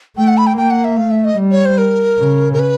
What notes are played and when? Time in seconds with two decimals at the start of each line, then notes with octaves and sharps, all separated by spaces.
0.17 A3 G5
0.27 F#5
0.38 B5
0.47 G5
0.57 A#3 G5
0.71 F#5
0.84 E5
0.97 A3 F5
1.11 E5
1.24 D#5
1.38 G3
1.51 C#5
1.65 C5
1.78 A#4
2.19 C#3
2.53 A#4
2.59 B4